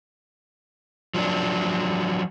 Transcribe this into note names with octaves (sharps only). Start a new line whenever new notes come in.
F3 F#3 D4